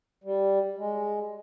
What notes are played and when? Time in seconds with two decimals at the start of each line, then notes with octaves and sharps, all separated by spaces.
0.24 G3
0.78 G#3